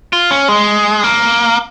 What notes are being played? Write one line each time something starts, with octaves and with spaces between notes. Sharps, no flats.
F4
C#4
G#3
A#3